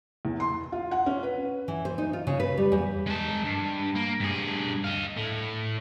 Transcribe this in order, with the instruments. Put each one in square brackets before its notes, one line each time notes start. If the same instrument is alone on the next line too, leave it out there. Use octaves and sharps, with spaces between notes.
[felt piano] E2
C6
F4
F#5
C#4
B4
[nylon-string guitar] E3
C5
D#4
F4
C#3
B4
G3
E2
[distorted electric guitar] G#3 A5
G2
A#3
G2 G#4
D#5 F5
A2